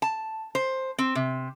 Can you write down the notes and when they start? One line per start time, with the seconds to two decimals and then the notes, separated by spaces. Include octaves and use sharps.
0.02 A5
0.55 C5
0.98 C4
1.15 C3